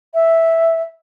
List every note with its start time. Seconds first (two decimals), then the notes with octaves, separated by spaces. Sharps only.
0.14 E5